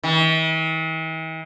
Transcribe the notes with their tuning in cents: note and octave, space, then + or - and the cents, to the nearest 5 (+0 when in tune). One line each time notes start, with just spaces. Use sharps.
E3 -45